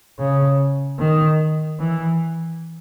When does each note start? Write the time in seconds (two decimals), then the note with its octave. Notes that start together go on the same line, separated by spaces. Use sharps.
0.19 C#3
0.99 D#3
1.79 E3